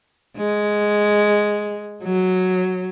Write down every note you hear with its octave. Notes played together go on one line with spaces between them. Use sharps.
G#3
F#3